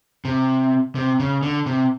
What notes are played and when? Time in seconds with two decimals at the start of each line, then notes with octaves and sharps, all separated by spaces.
0.25 C3
0.95 C3
1.20 C#3
1.43 D3
1.66 C3